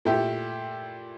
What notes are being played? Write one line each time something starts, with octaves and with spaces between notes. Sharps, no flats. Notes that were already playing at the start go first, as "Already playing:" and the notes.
A#2 A3 E4 G4